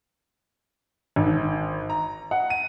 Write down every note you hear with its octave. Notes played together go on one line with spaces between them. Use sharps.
G#1
A#5
F#5
D#7